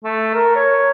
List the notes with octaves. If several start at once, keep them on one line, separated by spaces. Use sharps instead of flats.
A3
A#4
C#5